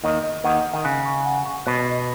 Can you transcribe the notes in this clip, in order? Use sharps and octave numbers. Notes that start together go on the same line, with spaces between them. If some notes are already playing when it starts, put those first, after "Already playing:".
D#2 D#3 D#5
D#5
D#2 D#3 F#5
D#5
D#3
C#3 F#6
C#6
F#5
C#6
B2 F#6
D#5